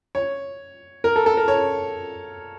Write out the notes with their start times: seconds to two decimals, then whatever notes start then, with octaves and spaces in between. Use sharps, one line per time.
0.15 C#5
1.04 A#4
1.16 A4
1.26 A4
1.37 A#4
1.48 C#5